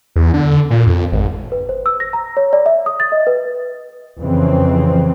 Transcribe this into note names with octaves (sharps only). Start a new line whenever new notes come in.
E2
D3
A#2
F2
G#1
B4
C5
E6
A#6
A#5
C#5
D5
E5
D#6
A6
D#5
B4
F2 C#3 E3 C4